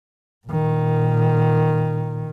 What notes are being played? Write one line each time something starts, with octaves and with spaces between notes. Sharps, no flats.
A#2 D#3